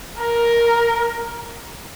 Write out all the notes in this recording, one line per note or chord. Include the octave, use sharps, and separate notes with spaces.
A#4